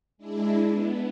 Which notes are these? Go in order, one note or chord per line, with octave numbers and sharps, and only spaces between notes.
G#3 D4 E4
B3